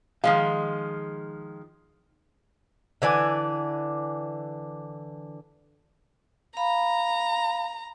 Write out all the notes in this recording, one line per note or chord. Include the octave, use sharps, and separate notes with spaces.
D#3 F3 G#3 F5
D3 E3 D5 G#5
F5 A#5 B5